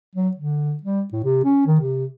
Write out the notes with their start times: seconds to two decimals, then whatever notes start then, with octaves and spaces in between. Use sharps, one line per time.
0.16 F#3
0.37 D3
0.83 G3
1.12 A2
1.24 C3
1.44 C#4
1.67 D#3
1.80 C3